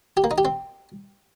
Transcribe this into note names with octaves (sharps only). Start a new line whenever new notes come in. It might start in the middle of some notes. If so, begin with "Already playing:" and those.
G4
A#3
D#4
G4
C4